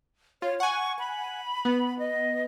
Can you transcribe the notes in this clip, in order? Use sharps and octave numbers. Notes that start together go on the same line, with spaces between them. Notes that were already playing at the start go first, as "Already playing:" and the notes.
F4 C#5
F#5 G#5 C#6
B5
B3
D#5